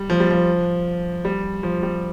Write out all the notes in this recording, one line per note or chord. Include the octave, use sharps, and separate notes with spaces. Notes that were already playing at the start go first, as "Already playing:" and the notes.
Already playing: G3
F3
G3
F3
G3
F3
G3